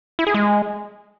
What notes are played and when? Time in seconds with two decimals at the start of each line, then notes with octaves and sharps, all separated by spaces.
0.19 E4
0.27 G#4
0.34 G#3